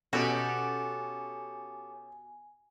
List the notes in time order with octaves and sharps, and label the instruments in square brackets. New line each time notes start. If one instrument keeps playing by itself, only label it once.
[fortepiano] B2 [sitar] C#4 G4 A4 [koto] F#4 [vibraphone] G#5